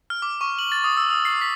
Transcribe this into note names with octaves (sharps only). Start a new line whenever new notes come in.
F6
D6
C#6
F#7
A6
D#6
E6
D#6
C7
B6